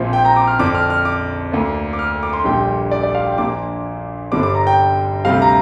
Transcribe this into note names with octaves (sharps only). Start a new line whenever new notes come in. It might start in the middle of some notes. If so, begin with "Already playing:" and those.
Already playing: A#1 A#2 F3 C4
G5
A#5
D6
F6
F2 D3 F3 D4 D6
F6
F6
D6
D2 D3 A#3 D4
D6
F6
D6
C6
A#1 A#2 G3 D4 G5
D5
D5
F5
G5
A#1 A#2 A#3 D4 D6
G1 G2 D3 G3 D4 D6
D6
A#5
G5
D2 C3 G3 F5
A#5